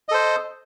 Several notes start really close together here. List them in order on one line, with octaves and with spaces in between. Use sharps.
D#5 A4 C5